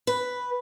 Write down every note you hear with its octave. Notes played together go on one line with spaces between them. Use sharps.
B4